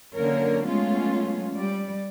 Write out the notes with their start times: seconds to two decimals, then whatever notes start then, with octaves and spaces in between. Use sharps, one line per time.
0.15 D3 F#3 A#3 C#4 A#4 C#5
0.66 F#3 G#3 A3 B3 C#4 F4
1.54 G3 D5